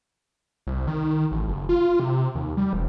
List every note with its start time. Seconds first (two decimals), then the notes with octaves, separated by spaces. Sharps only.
0.67 C2
0.87 D#3
1.31 A1
1.48 F#1
1.69 F4
2.00 C3
2.35 D#2
2.57 G3
2.73 E1